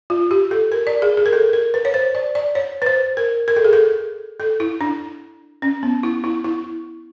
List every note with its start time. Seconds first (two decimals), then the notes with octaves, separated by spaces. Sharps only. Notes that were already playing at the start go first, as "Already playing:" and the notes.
0.10 F4
0.31 G4
0.51 A4
0.72 A#4
0.87 D5
1.02 G#4
1.17 G#4
1.26 A#4
1.33 A4
1.53 A#4
1.74 B4
1.85 C#5
1.94 C5
2.15 D5
2.35 D5
2.55 C#5
2.82 B4
2.86 C5
3.17 A#4
3.48 A#4
3.56 A4
3.65 G#4
3.73 A4
4.40 A4
4.60 E4
4.81 D4
5.62 C#4
5.83 B3
6.03 E4
6.24 E4
6.44 E4